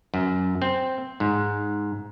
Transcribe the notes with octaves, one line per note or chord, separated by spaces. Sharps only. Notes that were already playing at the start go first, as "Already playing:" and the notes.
F#2
C4
G#2